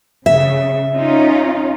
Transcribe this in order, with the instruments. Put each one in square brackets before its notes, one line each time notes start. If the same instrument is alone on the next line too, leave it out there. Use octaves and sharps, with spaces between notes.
[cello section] C#3 [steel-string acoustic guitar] E5
[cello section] C#4 D#4 F4